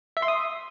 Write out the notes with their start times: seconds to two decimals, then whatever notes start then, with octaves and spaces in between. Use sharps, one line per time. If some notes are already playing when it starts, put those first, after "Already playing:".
0.17 E5
0.22 C6
0.28 D#6